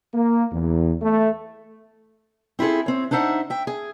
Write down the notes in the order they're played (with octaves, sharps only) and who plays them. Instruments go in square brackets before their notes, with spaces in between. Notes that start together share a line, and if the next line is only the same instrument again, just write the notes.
[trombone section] A#3
E2
A3
[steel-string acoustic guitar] C4 E4 F4 G#4 A4
C4 C#5
D4 D#4 C5 E5 F#5
E5 G5
G#4